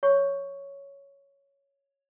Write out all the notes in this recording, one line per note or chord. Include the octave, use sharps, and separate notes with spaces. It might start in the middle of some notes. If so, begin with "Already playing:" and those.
C#5 C#6